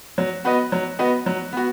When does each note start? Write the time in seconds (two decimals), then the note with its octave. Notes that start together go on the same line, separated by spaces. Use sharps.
0.18 F#3
0.44 B3 F#4 B4 D#5
0.72 F#3
0.99 B3 F#4 B4 D#5
1.26 F#3
1.53 B3 F#4